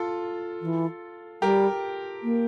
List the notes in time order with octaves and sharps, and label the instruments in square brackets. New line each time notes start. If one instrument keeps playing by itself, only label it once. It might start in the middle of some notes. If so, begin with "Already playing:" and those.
Already playing: [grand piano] F4 A4
[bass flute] E3
[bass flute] G3 [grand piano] G4 A#4
[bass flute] A#3